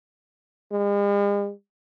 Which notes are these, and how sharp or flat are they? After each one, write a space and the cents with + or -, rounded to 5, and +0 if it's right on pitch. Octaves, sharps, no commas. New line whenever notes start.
G#3 -45